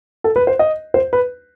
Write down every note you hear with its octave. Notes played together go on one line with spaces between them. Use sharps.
A4
B4
C5
D#5
C5
B4